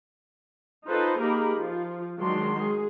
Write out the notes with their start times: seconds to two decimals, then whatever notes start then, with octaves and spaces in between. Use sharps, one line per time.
0.87 D#4 F4 A4 B4 C5 D#5
1.20 A#3 D#4 G4 G#4 A#4 B5
1.57 F3 F4
2.17 D#3 F#3 G#3 D4 C6
2.58 G#3 G#4